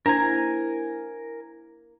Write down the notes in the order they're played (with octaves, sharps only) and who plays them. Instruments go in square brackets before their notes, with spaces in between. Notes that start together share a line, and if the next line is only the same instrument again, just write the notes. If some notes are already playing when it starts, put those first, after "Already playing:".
[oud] A#3 E4 C5 [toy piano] D4 [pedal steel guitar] A#4 G#5 [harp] A#5